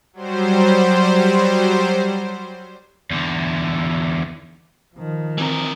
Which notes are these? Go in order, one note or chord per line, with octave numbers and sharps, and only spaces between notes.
F#3 G3 C5
E2 D3
D#3 F3
E3 C4 A#4